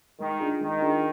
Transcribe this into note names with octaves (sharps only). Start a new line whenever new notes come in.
D#3 G#3
D4 F4 G#4
D#3 G#3
D4 F4 G#4